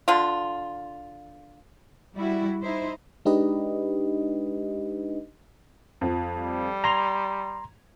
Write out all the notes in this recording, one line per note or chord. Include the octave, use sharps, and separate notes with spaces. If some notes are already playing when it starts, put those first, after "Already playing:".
D3 F4
G3 E4 F#4
D#4 E4 C5
G#3 D4 D#4 G4 B4 D#5
F2 F3
G3
A#5 C6 G#6 F7